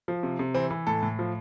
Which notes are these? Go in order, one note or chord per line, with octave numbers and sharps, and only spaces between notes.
F3
C3
C3
E3 C4
E3
A2 A4
A2
F3